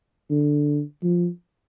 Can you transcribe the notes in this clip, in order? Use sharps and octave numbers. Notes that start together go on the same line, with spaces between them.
D3
F3